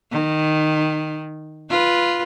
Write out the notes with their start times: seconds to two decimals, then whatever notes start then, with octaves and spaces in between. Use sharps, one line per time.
0.11 D#3
1.70 F4 B4